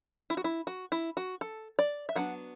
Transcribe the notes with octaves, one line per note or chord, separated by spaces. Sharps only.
E4
F#4
E4
F#4
E4
F#4
A4
D5
E5
F#3 B3 D4 F#5